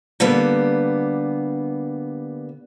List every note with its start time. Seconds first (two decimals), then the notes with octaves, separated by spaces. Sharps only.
0.20 D3 G3 A#3 B3